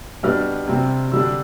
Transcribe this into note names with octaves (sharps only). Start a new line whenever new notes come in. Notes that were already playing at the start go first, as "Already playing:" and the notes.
B2 G3 B3 D4 F6
C3 G3 C4
D3 G3 D4 E6